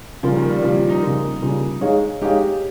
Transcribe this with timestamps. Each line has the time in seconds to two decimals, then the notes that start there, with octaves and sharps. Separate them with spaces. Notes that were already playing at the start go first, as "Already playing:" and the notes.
0.23 C#3 F3 G3 A#3 F4 A#4
0.36 D#3
0.49 G3
0.62 C#3 F3 G3 A#3 F4 A#4
0.76 F3
0.89 D#4
1.02 C#3 G3 A#3 F4 A#4
1.42 C#3 G3 A#3 F4 A#4
1.81 G#3 D#4 G#4 C#5 F5
2.21 G#3 D#4 G4 G#4 C#5 F5